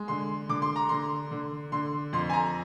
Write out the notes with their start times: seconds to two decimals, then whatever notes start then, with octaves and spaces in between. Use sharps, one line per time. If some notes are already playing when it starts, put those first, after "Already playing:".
Already playing: G#3
0.08 D3 C6
0.49 D3 D6
0.62 C6
0.76 A#5
0.89 D3 C6
1.31 D3
1.72 D3 C6
2.13 F2 C6
2.29 G#5
2.33 A#5